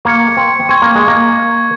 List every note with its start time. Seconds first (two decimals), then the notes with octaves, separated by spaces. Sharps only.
0.05 A#3 C#6 G#6 C#7
0.37 C4
0.69 C4 C#6 G#6 C#7
0.82 A#3
0.95 G#3
1.08 A#3